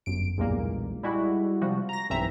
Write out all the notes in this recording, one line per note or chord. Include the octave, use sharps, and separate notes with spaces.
G1 F#2 D7
B1 E2 G2 A#2 G#3 A#3
G3 G#3 E4 F#4
C3 F3 G3 F#4
A#5 A#6
B1 G2 E3 C4 E5 A#5